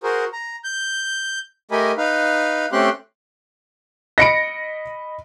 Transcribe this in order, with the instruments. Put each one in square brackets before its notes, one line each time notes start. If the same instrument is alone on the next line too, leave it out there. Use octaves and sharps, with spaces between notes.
[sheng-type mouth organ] F#4 G#4 A#4 C5
A#5
G6
A3 G4 A#4 D#5 G#5 B5
D#4 B4 F5
A3 C4 C#4 G4 C6 F#6
[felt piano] D#5 B5 [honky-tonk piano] A#6 C#7 D7